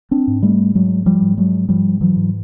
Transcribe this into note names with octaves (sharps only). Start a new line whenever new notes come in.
C4 D4
G#2
G3 A3
G#2 F#3 G#3
F3 G3
G#2
F#3 G#3
G#2 F3 G3
E3 F#3
G#2